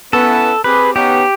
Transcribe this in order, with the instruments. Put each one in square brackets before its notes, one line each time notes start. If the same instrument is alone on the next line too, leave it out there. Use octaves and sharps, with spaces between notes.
[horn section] B3 C#4 E4 [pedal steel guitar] A4
[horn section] C4 G4 G#4 [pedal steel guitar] B4
[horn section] B3 C#4 D#4 [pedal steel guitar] G4